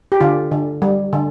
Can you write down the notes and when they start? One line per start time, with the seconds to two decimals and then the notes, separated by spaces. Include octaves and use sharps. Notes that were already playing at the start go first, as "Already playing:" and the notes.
0.12 G4
0.21 D3 F4
0.51 D3
0.82 G3
1.13 D3